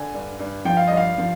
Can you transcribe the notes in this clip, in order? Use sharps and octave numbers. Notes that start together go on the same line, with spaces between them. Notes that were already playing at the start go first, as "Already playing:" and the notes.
Already playing: D3 G#5
G2
G2
F3 G5
F5
G2 D#5
F5
F3